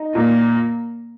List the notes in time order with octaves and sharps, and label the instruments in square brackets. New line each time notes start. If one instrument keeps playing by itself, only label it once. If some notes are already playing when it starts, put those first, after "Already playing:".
Already playing: [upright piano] D#4
[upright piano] A#2 [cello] A#3